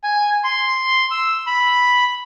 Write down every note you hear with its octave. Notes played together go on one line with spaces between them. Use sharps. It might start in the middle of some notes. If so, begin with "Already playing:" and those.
G#5
C6
E6
B5